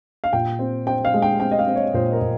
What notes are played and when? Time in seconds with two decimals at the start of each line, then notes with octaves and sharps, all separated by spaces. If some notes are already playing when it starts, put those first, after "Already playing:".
0.24 F5
0.33 A#2 G5
0.59 C4
0.87 C4 G5
1.05 F5
1.14 G#3
1.22 G5
1.40 C4 G5
1.51 D#5
1.59 F5
1.68 C4
1.76 C#5
1.94 A#2 C5
2.13 A#4
2.21 A#2